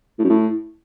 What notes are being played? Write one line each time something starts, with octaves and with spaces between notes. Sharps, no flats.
A2
F#2
A2